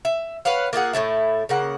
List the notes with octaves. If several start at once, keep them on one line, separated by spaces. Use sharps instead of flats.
E5
B4 C#5 F5 F#5
A#3 F4 G#4 F#5
A2 C3 A3 E4
C#3 A#3 F#5